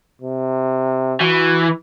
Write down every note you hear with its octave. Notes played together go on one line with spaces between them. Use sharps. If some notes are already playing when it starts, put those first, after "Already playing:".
C3
E3 F#4